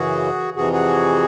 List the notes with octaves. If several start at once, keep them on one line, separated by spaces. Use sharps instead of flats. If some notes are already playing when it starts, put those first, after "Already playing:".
Already playing: F#2 C#3 E3 F#4 G#4
F2 C3 E3 F#4 G#4
F#4 G#4